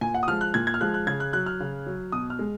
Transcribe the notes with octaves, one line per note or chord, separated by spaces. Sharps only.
A#2 G#5
F#5
D#6
F3 G#3 F6
F#6
A#2 G#6
G#6
F6
F3 G#3 F#6
F#6
C#3 G#6
F#6
F#3 F#6
F6
C#3
F#3
B2 D#6
F6
G#3